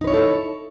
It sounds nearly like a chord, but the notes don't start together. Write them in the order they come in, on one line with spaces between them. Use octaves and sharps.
D#4 B4 C#5 E4 A4